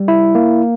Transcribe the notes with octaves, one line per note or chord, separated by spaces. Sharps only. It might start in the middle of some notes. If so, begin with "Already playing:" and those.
Already playing: G3
E4
A#3